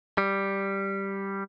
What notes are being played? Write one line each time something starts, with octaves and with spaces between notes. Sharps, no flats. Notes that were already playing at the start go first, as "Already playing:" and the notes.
G3